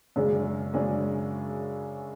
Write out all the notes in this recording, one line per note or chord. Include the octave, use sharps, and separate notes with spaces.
F#2 C#3 G#3 D4 G#4
F#2 C#3 G#3 D4 G#4